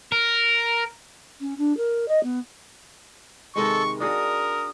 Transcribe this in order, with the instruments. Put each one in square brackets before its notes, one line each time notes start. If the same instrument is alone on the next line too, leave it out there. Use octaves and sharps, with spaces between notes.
[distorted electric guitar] A#4
[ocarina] C#4
D4
A#4
D#5
B3
[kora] C3 D#3 G#3 [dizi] A4 [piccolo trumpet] C#6
[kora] D4 F#4 G#4 [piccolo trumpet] A#4 [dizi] D#6